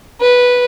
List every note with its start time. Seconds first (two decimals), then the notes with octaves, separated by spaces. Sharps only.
0.20 B4